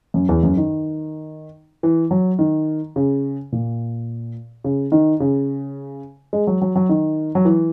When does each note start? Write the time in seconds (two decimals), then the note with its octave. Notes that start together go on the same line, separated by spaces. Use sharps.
0.14 F#2
0.29 E2
0.43 F#2
0.57 D#3
1.83 E3
2.11 F#3
2.39 D#3
2.96 C#3
3.52 A#2
4.64 C#3
4.92 D#3
5.20 C#3
6.33 G#3
6.47 F#3
6.62 F#3
6.76 F#3
6.89 D#3
7.35 F#3
7.45 E3